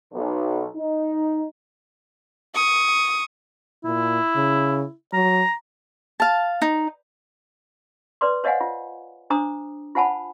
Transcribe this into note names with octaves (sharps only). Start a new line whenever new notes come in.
B1
D#4
C#6 D#6
A#2 E4
C#3
F#3 A#5
F5 A5
D#4
B4 D5 C6 D6
C5 C#5 D#5 F5 F#5 G#5
F4
D4 C5 A#5 D6 D#6
F4 C5 F#5 G#5 A5 B5